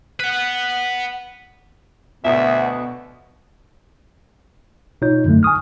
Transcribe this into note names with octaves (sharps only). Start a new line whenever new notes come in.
B4 F#5
D2 B2 B3 E5
B2 D#4 F4 C#5 G6
F#2 D3 F#3 A3
G#5 C#6 D#6 F6